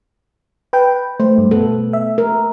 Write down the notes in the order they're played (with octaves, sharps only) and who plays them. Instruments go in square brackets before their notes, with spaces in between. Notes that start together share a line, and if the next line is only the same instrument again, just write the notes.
[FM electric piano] B4 G5
[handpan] A3 [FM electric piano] C5
[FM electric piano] G2
[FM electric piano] B2 B3 [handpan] A4
[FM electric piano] E5
[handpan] A#4